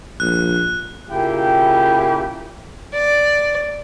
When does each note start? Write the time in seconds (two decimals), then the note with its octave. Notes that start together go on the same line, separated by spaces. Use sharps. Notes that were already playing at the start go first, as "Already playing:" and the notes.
0.20 A#1 F#6
1.09 A#2 C#3 E4 G4
2.94 D5